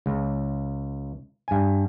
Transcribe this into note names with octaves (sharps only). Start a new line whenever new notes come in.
C#2
G2 G#5